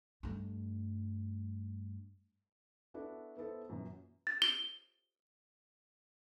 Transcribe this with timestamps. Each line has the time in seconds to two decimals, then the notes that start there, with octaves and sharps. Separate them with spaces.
0.23 G2 A3
2.94 B3 D4 E4 F#4 A4
3.37 B3 E4 A4 C5
3.69 F#2 A#2 E3
4.27 A6
4.42 G7